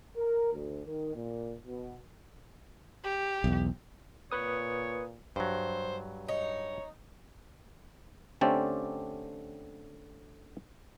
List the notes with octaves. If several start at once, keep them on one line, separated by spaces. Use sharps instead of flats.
A#4
D2
D#3
A#2
B2
G4
B1 E2
A#2 B4 C#5 D#6
G2 F#3 C5
D#4 C#5
D3 A3 C4 C#4 G4 D5